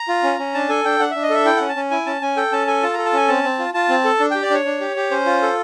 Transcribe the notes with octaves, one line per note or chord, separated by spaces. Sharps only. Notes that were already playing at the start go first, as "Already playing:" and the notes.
Already playing: A#5
F4
C#4
C#4
D4 A5
A4 G#5
D4 G5
D4 F#5
D4 E5
D#5
A4 E5
E4 G5
C#4 F#5
A5
C#4
E4 G#5
C#4 A5
C#4 G#5
A4 G5
C#4 A5
A4 G#5
F4 A5
A4 A#5
A5
C#4 G#5
C4 A5
C4
F4
F4 A5
C4
A4
D4
G4 G5
D5
D4 C#5
D4
G4
G4
C#4 C5
F4
A4